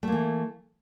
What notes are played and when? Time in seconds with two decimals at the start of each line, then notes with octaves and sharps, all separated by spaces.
0.03 A3
0.08 A#3
0.12 E3